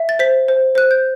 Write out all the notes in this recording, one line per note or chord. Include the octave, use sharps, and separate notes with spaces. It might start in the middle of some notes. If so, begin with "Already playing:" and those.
Already playing: E5
A6
C5 B6
C5
C5 F#6
G6